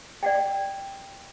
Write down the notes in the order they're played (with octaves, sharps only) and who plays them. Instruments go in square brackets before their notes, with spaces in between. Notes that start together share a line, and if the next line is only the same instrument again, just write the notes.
[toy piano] D5 F#5 G5